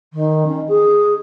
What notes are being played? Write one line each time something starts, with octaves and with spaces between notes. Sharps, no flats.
D#3
C#4
G#4